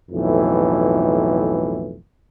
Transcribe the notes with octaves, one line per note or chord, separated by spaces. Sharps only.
B1 F2 A2 E3